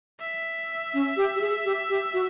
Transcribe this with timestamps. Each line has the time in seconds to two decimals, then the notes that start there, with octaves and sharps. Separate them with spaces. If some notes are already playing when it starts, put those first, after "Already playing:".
0.20 E5
0.94 C#4
1.17 G4
1.36 G4
1.41 G#4
1.65 G4
1.89 G4
2.14 F#4